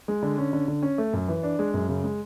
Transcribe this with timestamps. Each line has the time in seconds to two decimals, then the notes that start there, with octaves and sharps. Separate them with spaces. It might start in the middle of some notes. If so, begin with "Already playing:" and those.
0.08 G#3
0.23 D3
0.38 C#4
0.53 D3
0.68 D3
0.83 C#4
0.98 A3
1.13 F#2
1.28 E3
1.43 D4
1.59 G#3
1.74 F#2
1.89 C#3
2.04 G#3